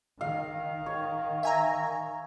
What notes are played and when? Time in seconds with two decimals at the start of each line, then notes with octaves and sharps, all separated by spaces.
0.21 D#3 F5
0.86 C#5
1.43 E5 G#5 A#5